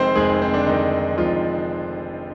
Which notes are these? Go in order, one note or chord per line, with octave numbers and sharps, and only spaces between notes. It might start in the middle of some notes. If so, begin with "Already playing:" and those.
Already playing: F1 F2 D#3 G#3 C4 C5
F1 F2 D#3 G#3 G#4
C4
D3 D4
F1 F2 D#3 G#3 D#4
F1 F2 D#3 F3 G#3 F4